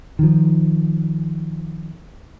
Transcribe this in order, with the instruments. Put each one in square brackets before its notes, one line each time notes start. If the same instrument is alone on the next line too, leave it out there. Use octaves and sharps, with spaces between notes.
[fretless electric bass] D#3 F3